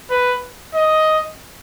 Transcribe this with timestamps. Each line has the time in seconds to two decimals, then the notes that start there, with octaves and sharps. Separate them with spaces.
0.10 B4
0.75 D#5